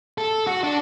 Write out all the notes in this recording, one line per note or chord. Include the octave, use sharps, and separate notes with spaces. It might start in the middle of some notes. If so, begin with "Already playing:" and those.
A4
F#4
D4